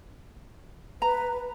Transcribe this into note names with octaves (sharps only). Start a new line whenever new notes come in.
B4 A#5